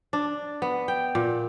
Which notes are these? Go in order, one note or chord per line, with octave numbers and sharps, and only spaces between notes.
D4
B3
G5
A#2